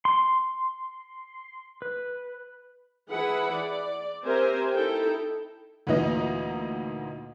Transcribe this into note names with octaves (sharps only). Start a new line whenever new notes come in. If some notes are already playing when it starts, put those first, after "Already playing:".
C6
B4
E3 E4 G#4 B4 F#5 B5
D5
C4 G4 A#4 C5 E5 G#5
D#4 E4 A4 G5
D2 A#2 E3 D#4 D#5